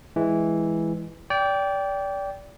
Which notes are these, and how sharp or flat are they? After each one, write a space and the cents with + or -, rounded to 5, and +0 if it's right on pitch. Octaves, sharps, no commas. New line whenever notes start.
E3 +0 G#3 +0
D5 -25 G5 +0